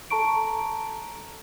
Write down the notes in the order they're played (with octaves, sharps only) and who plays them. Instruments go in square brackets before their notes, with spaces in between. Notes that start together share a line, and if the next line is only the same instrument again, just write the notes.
[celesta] A4 A5 A#5 C#6 D7